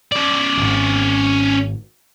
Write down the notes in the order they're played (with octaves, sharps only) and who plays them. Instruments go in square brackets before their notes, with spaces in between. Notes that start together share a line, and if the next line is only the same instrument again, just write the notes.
[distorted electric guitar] C#4 D5
[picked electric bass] D1 G#1